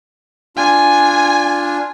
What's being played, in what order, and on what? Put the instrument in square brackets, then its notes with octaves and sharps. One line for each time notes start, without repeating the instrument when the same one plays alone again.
[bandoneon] D4 F4 [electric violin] G#5